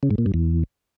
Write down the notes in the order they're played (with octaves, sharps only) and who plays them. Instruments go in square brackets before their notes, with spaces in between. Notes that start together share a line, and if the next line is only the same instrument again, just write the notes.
[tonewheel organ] C#3
G#2
A#2
G2
E2